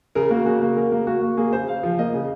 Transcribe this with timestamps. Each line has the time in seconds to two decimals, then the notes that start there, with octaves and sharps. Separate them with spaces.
0.15 C#3 A#4
0.30 A#3 F#4
0.46 C#3 F#4
0.61 A#3
0.77 C#3 A#4
0.92 A#3
1.07 A#3 F#4
1.22 A#3
1.37 A#3 G#4
1.53 C#3 C5
1.68 C#3 F5
1.83 F3
1.99 A#3 D#5
2.14 C#3